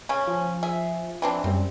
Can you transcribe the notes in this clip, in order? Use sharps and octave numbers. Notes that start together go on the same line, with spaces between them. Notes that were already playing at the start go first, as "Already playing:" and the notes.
C#3 C#4 G#5
F3
G#4 E5
E3 C4 D4
F#2 G3 C4